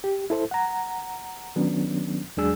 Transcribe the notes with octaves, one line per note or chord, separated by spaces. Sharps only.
G4
E4 A4 C5
F#5 A#5
D#3 F#3 B3 C#4 D4
E2 F#3 G#3 D4 G#4 E6